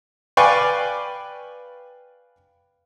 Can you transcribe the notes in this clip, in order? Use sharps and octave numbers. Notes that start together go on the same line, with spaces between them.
B4 D5 F5 G5 G#5 C#6